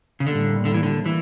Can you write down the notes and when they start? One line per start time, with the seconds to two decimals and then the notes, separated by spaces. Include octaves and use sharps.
0.20 C#3
0.27 A2 D3 G3 A#3
0.65 D3
0.74 E3
0.83 D3
1.06 E3